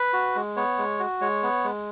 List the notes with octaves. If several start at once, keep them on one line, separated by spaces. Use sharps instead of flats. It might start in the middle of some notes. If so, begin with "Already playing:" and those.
Already playing: B4
F#4
G#3
B3 C#5
G#3
F#4
G#3 C#5
B3
G#3